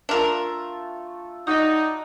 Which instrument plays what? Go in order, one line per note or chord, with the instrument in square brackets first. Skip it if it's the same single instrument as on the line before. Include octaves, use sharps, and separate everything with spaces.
[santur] A3 F4 A4 [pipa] D4 A#4
[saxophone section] D#4 [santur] F#4 D5 [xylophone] D#5 D#6